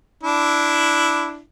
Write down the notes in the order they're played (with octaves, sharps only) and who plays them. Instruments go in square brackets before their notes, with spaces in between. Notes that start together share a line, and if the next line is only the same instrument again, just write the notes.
[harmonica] D4 E4